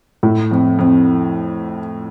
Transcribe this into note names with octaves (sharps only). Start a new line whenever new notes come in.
A2
F2
F2